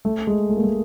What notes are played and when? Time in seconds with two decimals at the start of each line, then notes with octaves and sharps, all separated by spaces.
0.05 A3
0.27 G#3
0.49 A3
0.57 A#3
0.64 A3